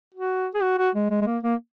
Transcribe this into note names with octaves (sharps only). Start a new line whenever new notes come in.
F#4
G#4
F#4
F#4
G#3
G#3
G#3
A#3
A#3